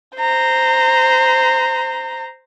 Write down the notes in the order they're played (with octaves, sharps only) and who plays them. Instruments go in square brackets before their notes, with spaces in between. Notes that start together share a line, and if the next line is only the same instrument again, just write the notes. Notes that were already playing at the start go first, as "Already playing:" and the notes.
[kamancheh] C5 A#5